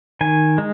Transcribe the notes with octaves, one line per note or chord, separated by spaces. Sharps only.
D#3 G#5
G#3